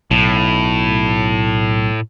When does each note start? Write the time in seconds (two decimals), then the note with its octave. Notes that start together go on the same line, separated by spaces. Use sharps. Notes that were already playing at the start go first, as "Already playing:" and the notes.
0.11 B1 A2